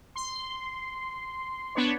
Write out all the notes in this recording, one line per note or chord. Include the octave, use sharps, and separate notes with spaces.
C6
B3 D4 B4 C#5